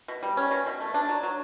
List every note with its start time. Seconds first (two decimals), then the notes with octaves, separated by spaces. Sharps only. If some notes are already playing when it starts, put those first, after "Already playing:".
0.08 B2
0.23 G3
0.37 C#4
0.51 B2
0.66 B2
0.80 A3
0.94 D4
1.09 F#3
1.23 F#3